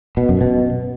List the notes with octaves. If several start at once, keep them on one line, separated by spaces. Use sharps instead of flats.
B2
F#2
B2